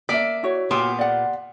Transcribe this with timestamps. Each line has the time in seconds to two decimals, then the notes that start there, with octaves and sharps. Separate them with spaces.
0.09 A#3 D5 E5 B6
0.43 E4 F#4 C#5
0.71 A#2 B3 G4 C6
0.99 D5 F#5